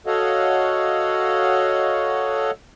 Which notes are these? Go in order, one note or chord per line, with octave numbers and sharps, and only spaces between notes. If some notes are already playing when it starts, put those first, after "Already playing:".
F#4 A4 C#5 D#5 F5 F#5